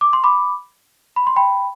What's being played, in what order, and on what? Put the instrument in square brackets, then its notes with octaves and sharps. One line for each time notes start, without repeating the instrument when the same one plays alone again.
[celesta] D6
C6
B5 D6
B5
C6
G5 B5